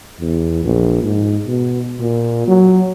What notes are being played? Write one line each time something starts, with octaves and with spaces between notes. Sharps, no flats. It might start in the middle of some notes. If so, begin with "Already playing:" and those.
E2
A#1
G#2
B2
A#2
F#3